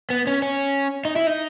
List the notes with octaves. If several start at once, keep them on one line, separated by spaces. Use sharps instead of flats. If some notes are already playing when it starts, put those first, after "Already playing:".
B3
C#4
C#4
D#4
E4
D#4